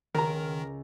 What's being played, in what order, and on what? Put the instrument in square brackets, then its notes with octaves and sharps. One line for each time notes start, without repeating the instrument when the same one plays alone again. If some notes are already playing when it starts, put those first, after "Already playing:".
[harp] C#2 [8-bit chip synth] D#3 [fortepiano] A#4 A#5